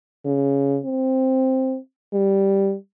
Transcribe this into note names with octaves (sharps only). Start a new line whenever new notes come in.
C#3
C4
G3